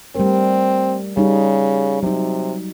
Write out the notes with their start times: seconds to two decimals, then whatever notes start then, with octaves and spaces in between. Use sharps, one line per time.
0.15 G3 A3 C4 A#4
1.17 C#3 G3 D#4
2.03 C3 F#3 D#4